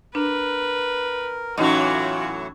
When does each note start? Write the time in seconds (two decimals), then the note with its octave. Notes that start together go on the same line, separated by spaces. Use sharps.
0.15 D4 A#4 B4
1.58 A2 E3 F#3 C#4 D#4 F4 F#4 D#5